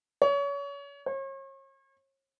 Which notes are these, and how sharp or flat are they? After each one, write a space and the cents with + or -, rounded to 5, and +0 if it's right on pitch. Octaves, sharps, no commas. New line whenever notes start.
C#5 +30
C#5 -40